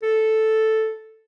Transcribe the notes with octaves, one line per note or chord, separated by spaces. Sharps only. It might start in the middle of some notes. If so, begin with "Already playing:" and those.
A4